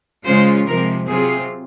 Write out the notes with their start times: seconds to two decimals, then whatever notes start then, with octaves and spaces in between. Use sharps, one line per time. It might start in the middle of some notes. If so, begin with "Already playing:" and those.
0.25 C#3 G#3 C#4 F4 C5
0.67 C3 F3 G#3 A#4
1.07 C3 F#3 C4 F4 G#4